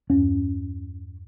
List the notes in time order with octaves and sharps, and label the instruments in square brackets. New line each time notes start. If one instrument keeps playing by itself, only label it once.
[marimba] E2 G2 [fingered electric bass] C#4